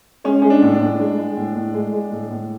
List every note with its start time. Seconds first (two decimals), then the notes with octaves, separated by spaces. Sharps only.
0.24 G#3 C#4
0.42 G#3 C#4
0.50 D4
0.62 A2
0.74 D4
0.81 A2
1.00 G#3
1.18 G#3
1.37 A2
1.55 A2
1.74 G#3
1.93 G#3
2.12 A2
2.30 A2